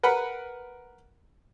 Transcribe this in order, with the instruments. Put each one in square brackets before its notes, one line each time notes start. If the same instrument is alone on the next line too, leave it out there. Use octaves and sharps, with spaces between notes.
[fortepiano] A#4 B4 F#5 B5